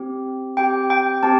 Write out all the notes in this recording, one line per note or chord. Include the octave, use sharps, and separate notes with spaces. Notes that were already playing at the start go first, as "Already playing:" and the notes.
Already playing: C4 G4
C4 G4 G5
G5
C4 G4 A5